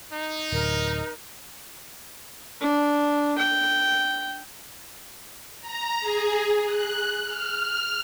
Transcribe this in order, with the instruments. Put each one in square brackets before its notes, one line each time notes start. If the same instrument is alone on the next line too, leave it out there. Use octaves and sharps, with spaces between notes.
[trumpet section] D#4
[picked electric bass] D1 [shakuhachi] A#4
[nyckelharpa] D4
G5
[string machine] A#5
G#4
F#6
F6